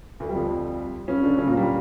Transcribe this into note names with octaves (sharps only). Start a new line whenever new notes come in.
D2 D3
G3
F2 F3
C#3 C#4
D3 D4
C#3 C#4
A#2 A#3
G3